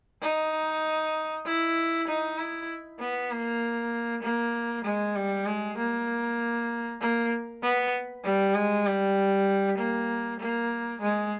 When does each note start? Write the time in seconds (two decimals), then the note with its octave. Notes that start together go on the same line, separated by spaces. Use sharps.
0.22 D#4
1.45 E4
2.08 D#4
2.38 E4
3.00 B3
3.31 A#3
4.23 A#3
4.85 G#3
5.16 G3
5.46 G#3
5.77 A#3
7.00 A#3
7.63 B3
8.24 G3
8.55 G#3
8.86 G3
9.78 A#3
10.40 A#3
11.02 G#3